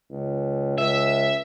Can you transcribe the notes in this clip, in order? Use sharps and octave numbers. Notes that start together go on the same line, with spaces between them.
C#2
C#2 E5